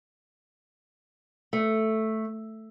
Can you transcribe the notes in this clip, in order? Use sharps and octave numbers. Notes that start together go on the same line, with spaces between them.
A3